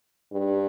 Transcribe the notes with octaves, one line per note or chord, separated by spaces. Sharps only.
G2